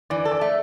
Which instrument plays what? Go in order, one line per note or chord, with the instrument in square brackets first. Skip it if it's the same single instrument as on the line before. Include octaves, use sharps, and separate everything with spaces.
[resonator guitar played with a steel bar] E3 [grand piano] D5
[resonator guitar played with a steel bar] A4
[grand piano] D5
[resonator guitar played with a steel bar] A3